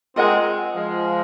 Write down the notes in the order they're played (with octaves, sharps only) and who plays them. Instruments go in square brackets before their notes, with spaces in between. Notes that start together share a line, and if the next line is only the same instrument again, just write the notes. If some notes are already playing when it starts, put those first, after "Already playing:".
[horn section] G#3 C4 [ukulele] F4 A#4 D#5 F#5
[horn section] F3 G#3